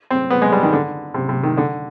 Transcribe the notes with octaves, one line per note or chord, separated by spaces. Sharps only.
C4
B3
G#3
G3
D#3
D3
C3
C3
D#3
D3